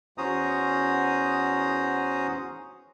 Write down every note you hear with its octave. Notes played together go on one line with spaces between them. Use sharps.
E2 C#4 F#4 C5 A#5 D#6